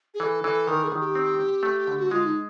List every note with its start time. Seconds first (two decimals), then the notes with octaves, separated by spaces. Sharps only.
0.14 G#4
0.20 E3 A4
0.44 E3 A4
0.67 D#3 A#4
0.84 G#4
0.92 D#3
1.00 G4
1.15 C4
1.39 C4
1.63 A3
1.87 D3
1.99 F#4
2.11 G#3 F4
2.24 D#4